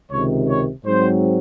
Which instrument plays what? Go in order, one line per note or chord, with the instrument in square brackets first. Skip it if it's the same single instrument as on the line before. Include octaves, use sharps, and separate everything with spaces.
[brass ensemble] C#2 C3 D#3 C#5
C#5
G#2 F#3 C4 C5